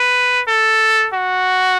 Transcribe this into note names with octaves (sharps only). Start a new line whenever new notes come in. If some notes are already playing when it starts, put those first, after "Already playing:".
Already playing: B4
A4
F#4